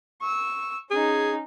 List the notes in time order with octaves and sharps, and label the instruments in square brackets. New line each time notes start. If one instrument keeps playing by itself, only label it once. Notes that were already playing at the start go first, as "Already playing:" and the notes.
[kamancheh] C#6 E6
[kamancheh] C#4 D#4 [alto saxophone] G#4